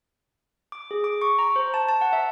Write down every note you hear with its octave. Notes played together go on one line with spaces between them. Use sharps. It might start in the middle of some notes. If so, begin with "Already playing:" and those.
D6
G#4
D6
C#6
A#5
C5
A5
A5
F#5
E5